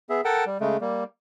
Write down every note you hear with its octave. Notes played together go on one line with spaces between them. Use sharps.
B3 G#4 E5
A4 A#4 F#5 G5 A5
G3
C#3 G#3 A3
G3 A#3